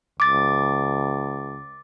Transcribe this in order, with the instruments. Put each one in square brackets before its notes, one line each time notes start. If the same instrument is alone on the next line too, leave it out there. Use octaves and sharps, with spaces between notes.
[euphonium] C#2 [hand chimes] D6 A6